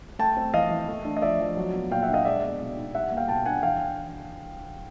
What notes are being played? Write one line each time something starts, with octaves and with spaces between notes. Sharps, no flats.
A3 G5 A5
C4
E3 D#5 F5
E3
A3
D4
D#5
F3 D5 E5
F3
F#3
B3
A#2 F5 G5
E5 F#5
D4
D#5 F5
G#3 D5 E5
B3
B2
D#4
G3 E5 F#5
A#3
F5 G5
B2 G5 A5
D4 F#5 G#5
E3 F5 G5